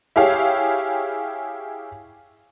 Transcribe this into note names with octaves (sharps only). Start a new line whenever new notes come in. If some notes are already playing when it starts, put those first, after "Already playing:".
E4 G4 G#4 C#5 F5